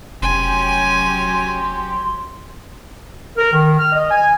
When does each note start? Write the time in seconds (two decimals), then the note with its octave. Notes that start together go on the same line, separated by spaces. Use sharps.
0.22 F1 F#3 C#4 G4 G#5 C6
3.38 A#4
3.53 D#3
3.79 F6
3.92 D#5
4.11 G#5